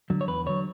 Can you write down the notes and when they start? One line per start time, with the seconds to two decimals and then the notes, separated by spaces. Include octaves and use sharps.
0.10 D3 F#3
0.21 C#5
0.28 E2 B4
0.46 D3 F#3 C#5